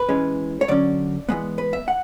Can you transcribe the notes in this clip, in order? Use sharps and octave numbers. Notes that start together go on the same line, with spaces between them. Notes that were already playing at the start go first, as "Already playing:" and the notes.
Already playing: B4
E3 G#3 C#4
C#5
D3 F#3 C#4 D5
E3 G#3 B3
B4
E5
F#5